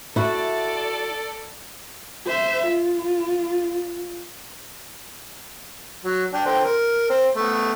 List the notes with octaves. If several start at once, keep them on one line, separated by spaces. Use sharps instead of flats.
E4 F#4 A4 D5
C5 E5
F4
F#3
D4 G5
D3 C5 G5
A#4
C4
A3 B3